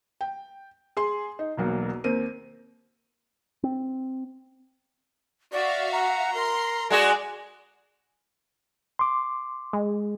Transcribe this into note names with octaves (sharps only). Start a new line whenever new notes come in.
G5
G#4 C6
D#4
E1 B1 F#3 A#3
D#2 C4 A#4 D#7
C4
F#4 D5 E5 F5
F#5 A#5
A#4 C6
G#3 F#4 G#4 D5
C6 D6
G#3